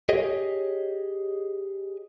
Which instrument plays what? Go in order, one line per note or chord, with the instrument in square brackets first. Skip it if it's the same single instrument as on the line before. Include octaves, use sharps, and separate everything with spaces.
[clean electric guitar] G4 G#4 C#5 D#5